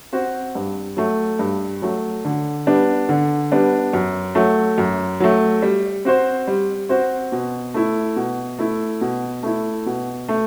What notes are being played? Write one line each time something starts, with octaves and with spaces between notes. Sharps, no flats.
C4 F#4 C5
G2
F#3 A3
G2
F#3 A3
D3
G3 B3 D4
D3
G3 B3 D4
F#2
F#3 A3
F#2
F#3 A3
G3
C4 F#4 C5
G3
C4 F#4 C5
B2
A3 E4
B2
A3 E4
B2
A3 E4
B2
A3